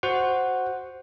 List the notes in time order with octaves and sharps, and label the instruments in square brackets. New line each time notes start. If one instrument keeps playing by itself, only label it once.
[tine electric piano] F#4 C5 F#5